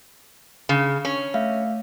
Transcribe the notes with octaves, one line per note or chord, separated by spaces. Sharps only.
C#3
C#4
A3 E5 F5